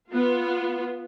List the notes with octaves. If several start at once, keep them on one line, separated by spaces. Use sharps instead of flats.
B3 F4